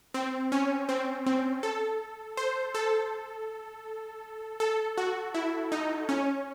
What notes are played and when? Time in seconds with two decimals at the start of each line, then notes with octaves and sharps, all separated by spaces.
0.14 C4
0.52 C#4
0.89 C4
1.26 C4
1.63 A4
2.37 C5
2.75 A4
4.60 A4
4.98 F#4
5.34 E4
5.72 D#4
6.09 C#4